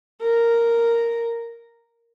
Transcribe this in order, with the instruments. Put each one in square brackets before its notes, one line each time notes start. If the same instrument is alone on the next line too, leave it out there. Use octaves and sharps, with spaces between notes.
[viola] A#4